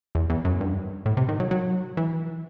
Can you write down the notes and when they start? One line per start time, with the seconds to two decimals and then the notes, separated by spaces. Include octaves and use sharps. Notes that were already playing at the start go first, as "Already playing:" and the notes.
0.15 E2
0.30 E2
0.45 F#2
0.61 G2
1.06 A2
1.17 C3
1.29 D#3
1.40 F#3
1.51 F#3
1.97 E3